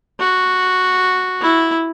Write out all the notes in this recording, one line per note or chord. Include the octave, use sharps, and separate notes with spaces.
F#4
E4